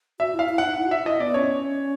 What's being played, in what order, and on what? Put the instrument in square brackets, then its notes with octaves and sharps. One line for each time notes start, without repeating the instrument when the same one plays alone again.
[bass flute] F#4 [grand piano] E5
[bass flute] E4
[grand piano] F5
[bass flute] E4
[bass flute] D#4 [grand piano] F#5
[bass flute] E4
F#4
[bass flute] F4 [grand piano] E5
[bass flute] E4 [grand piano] D#5
[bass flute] B3 [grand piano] D5
[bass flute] C#4 [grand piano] C#5